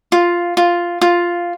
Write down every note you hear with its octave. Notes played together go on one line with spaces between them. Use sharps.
F4
F4
F4